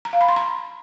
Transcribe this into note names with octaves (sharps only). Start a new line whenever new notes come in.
A#5
F5
B5
C6
A#5